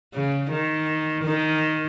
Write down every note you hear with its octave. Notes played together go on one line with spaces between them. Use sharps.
C#3
D#3
D#3